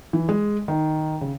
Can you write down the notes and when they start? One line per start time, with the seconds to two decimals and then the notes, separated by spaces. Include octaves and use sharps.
0.13 E3
0.29 G#3
0.68 D#3
1.21 C#3